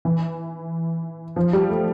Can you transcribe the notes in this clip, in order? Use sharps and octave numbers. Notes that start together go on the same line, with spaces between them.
E3
F3
G3
A3